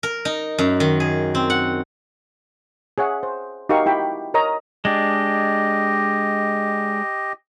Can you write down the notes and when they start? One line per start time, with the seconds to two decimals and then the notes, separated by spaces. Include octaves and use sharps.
0.03 A#4
0.25 D#4
0.59 F#2
0.80 D#3
1.00 G#4
1.35 C4
1.50 F#5
2.98 G#4 C#5 E5 F#5
3.23 C5
3.69 D#4 F#4 G4 A#4 F5 C#6
3.86 E4 G4 G5 B5
4.34 A#4 C#5 D#5 A#5 D#6
4.85 G#3 D4 G4 D#5